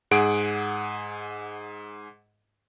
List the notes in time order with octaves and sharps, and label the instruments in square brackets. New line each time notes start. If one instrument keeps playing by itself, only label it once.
[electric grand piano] G#2 G#4 F#5 D7